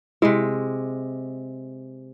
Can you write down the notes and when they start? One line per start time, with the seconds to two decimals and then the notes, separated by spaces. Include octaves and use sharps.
0.22 C3 G#3 E4